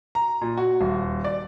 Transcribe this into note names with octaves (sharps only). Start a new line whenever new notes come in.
A#5
A#2
F#4
D#1
D5